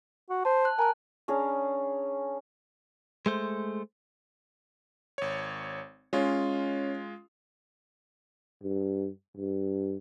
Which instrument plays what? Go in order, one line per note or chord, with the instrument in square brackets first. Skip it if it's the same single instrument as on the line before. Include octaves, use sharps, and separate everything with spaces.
[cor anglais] F#4
[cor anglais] C5 [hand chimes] A5
[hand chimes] F#6
[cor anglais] A#4 [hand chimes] G#5 A5 F#6
[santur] C#4 D4 G#4 A#4
[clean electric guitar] G#3 A3 C5
[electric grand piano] G#1 C#5
[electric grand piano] G#3 F4 [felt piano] C#4
[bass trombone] G2
G2